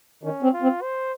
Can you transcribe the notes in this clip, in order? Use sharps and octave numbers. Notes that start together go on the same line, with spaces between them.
D#3 C#4
C4
F4
C4
C5